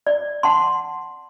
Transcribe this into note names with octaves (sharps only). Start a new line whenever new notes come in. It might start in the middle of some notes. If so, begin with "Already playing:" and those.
D5
F#5 A5 C6